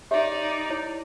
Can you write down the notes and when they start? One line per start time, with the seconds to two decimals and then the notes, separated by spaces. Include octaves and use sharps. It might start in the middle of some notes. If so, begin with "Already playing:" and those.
0.11 D#4 G4 C#5 D5 E5
0.70 E4 C#5